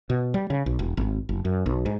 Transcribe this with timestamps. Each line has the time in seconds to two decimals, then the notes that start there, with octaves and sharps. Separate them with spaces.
0.10 B2
0.34 G3
0.50 C#3
0.66 B1
0.79 E1
0.97 G#1
1.29 F#1
1.45 F#2
1.66 B1
1.86 G#2